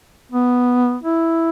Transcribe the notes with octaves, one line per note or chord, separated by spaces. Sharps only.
B3
E4